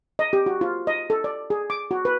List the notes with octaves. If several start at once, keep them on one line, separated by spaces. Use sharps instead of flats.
D#5
G4
F#4
F4
D#5
A4
D5
G#4
D6
F#4
B4